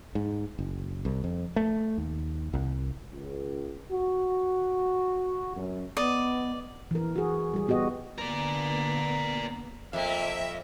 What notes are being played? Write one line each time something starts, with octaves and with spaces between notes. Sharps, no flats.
G#2
F#1
C2
F2
A3
D#2
C2
C#2
F#4
F#2
B3 D5 D#5
E3 A#4
F#4 G#4
G3 G#4
B3 F#4 G4 D#5
D3 A#3 B3 A#4 D5
F2 A#3 E5